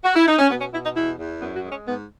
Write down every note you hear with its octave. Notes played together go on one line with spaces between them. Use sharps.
F#4
E4
D#4
C#4
B2 B3
C#4
B2 E4
D#4
E2 E4
E2
F#2 B3
F#4
G#3
C#4
G#2 B3